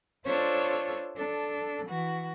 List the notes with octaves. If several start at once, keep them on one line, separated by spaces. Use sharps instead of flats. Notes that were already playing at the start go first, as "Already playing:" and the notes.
D4 F4 A4 C5 C#5
D4 A4
E3 F#4